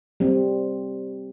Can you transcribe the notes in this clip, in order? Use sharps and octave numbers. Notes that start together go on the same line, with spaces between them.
G3 C4